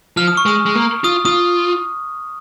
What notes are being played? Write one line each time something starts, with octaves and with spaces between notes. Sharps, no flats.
F3 F6
D#6
C#6
G#3 D#6
G#3
A#3
F4 D#6
F4 D#6